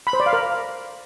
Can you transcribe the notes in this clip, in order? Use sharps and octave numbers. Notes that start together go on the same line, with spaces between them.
B5
C5
D5
F5
A#4